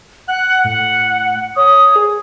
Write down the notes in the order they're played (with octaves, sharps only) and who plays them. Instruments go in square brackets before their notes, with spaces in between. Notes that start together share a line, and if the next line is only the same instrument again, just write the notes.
[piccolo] F#5 [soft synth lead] F#6
[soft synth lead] A2 [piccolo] F#5
[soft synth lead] C#5 [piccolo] D#6
[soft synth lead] G#4